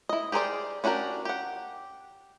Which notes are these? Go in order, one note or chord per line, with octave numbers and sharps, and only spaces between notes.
E4 D#5
G4 G#4 A#4 C5 D5
C#4 D4 F#4 G4 A#4
G4 F#5